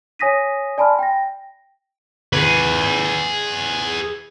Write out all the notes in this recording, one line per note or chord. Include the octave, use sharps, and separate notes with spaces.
C#5 G#5 D#6 A#6 B6 D#7
D5 G#5 A5 B5 C6 F6
G5 A#6
G#4 B4